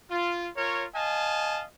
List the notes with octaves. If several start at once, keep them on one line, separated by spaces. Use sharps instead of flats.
F4
F4 A#4 C#5
D#5 F5 G#5 A5